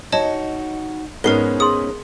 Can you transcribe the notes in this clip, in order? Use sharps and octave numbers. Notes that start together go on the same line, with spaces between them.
D#4 F#4 C#5 D#5 A5
G#2 G#3 B3 C#4 D#4 A#4 C7 G7
G#4 D#5 C6 D#6